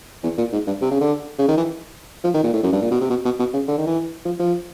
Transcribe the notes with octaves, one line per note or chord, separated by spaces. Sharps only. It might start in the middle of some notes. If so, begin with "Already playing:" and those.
E2
A#2
G#2
G2
C3
C#3
D3
C#3
D#3
E3
F3
D#3
A#2
A2
F#2
G2
A#2
B2
C3
B2
B2
B2
C#3
D3
D#3
E3
F3
F3